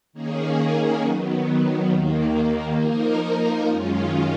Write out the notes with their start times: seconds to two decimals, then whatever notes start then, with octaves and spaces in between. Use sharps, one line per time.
0.13 D#3 A#3 C#4 G#4
1.01 D#3 F#3 B3
1.89 D#2 D#3 A#3
2.78 F3 A#3 D#4 A#4
3.66 F#2 D#3 G#3 C#4 F4